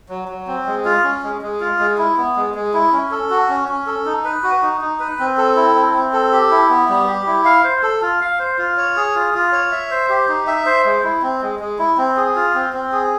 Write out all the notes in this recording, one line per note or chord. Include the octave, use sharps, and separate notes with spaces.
F#3
F#3
C4
G#3
F4
C#4
G#3
G#3
F4
G#3
E4
B3
G#3
G#3
E4
C#4
A4
F#4
C#4
C#4
A4
D#4
B4
F#4
D#4
D#4
B4
C4
A4
E4
C4
C4
A4
G4
E4
B3
G3
G4
E4
F5
C5
A4
F4
F5
C5
F4
C#5
G#4
F4
F4
C#5
E5
C5
G4
D#4
E5
C5
G#3
E4
C4
G#3
G#3
E4
C4
G#4
F4
C4
C4
G#4